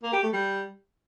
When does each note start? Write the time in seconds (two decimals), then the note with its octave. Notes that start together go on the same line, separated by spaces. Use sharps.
0.03 A#3
0.13 G4
0.23 A3
0.33 G3